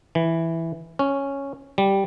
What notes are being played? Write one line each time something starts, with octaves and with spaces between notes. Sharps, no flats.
E3
C#4
G3